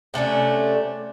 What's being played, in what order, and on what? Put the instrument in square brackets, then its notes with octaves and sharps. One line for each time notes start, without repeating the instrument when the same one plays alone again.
[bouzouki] C3 A3 C#4 D4